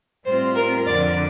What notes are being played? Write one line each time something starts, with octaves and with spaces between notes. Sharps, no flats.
A2 G3 C4 F4 C5
A#4
F2 D3 F3 D5